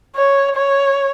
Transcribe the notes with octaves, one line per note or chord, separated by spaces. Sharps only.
C#5
C#5